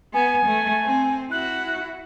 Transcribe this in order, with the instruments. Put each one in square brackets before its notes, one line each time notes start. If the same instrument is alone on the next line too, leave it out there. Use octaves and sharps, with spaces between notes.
[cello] B3 [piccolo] G#5
[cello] A3
C4
[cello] E4 F#4 [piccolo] F#6